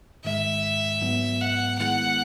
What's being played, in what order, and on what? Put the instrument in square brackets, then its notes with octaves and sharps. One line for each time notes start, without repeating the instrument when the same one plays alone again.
[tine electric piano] G#2 D#3 G#3 [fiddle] E5
[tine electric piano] G#2 F#3 B3
[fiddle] F#5
[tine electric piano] D#3 G#3 B3 E4 G#4 [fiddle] F#5